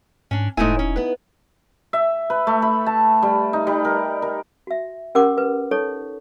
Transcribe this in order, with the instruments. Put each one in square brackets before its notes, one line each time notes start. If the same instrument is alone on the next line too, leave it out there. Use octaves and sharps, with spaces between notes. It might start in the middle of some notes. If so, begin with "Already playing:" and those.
[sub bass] G#2 [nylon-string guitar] C#4 D4
[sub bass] E1 [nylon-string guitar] G#2 A3 G#5 [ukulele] D#4 E4
[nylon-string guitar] C#4
B3 B4
[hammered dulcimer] E5
B4
A3
B5
A5
G3
D#4
G3
A#4
A#4
[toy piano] F#4 E5
C#4 G4 A#4 F#5 C6 D6
B4
D#4 A4 C#5 C#6